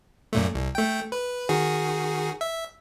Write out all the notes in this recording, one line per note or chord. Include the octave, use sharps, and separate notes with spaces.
F#2 A#2 A3
C2
A3 G5
B4
D#3 F#4 G#4
E5